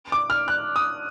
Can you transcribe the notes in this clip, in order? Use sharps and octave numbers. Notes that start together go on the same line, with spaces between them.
D6
F6
F#6
D#6